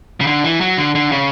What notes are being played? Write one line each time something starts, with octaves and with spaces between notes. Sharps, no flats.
C#3
D3
E3
F#3
D3
D3
C#3